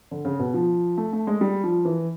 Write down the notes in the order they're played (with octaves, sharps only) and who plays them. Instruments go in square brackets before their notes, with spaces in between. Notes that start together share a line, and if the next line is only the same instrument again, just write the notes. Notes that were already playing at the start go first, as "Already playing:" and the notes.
[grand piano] D3
C#3
B2
F3
A3
A3
G#3
G3
F3
E3